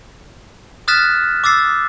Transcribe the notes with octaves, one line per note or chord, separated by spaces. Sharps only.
D#6 F6 F#6 A6 B6 E7
D6 E6 A6 C7